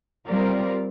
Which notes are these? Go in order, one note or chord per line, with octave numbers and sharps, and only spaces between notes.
G3 C4 F4 A#4 D5